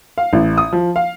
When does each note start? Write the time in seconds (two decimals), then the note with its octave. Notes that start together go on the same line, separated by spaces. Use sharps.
0.18 F5
0.33 A1
0.57 D#6
0.73 F3
0.96 F5